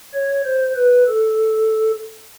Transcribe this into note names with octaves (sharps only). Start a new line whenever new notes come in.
C#5
C5
B4
A4